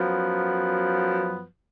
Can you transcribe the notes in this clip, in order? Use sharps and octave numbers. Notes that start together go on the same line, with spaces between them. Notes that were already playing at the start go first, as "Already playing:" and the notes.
Already playing: F#2 F3 B3